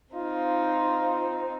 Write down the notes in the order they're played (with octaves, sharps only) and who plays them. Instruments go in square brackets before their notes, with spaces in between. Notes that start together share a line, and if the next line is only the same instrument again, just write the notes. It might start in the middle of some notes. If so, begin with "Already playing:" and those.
[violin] C4 D#4 [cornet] F4